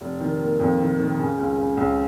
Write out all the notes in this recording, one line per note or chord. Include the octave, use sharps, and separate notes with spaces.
F1
D#3
A#3
F2
D#3
D#3
C#3
C#2
C#3
C#2